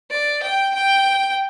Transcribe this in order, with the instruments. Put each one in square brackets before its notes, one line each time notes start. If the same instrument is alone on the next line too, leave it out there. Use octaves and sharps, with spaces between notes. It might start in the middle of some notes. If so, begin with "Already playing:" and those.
[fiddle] D5
G5
G5